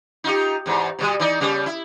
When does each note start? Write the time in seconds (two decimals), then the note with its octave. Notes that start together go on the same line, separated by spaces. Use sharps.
0.24 D#4 F4 G4
0.66 E2 G#2
0.99 B2 F3 G3
1.20 E3 D#4 D5
1.40 C#3 G3 B3
1.66 E4